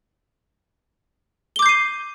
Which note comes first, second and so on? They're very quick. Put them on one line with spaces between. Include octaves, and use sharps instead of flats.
G7 D6 G6 C7 D#7